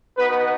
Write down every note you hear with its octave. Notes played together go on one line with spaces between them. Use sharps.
B3 D#4 F#4 B4